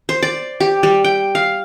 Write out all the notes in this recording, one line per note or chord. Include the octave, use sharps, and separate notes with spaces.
C5
D5
G4
G3
G5
F5